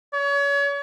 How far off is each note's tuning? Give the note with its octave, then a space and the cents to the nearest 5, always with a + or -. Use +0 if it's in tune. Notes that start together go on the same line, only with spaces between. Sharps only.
C#5 +35